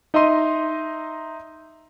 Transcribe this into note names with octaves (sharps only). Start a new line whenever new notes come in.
D#4 D#5 E5 A#5 C6 D#7